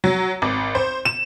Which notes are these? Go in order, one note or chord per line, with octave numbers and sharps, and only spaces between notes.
F#3
G#1
C5
E7